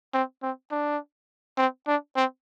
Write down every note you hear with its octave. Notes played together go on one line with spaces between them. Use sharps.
C4
C4
D4
C4
D4
C4